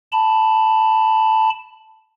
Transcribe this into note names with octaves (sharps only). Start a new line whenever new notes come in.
A5 B5